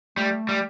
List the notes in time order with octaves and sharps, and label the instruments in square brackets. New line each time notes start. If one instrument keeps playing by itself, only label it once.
[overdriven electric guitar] G3 [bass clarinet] A3
[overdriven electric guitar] G3